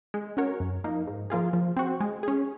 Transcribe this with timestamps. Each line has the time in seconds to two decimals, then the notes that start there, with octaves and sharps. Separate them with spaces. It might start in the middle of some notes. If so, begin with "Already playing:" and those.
0.14 G#3
0.37 C#4 F#4 A#4 C#5
0.60 F#2
0.84 F3 A#3 D#4
1.07 G#2
1.30 F3 A#3 F4 G#4
1.53 F3
1.77 C4 F#4
2.00 G#3
2.23 C#4 G#4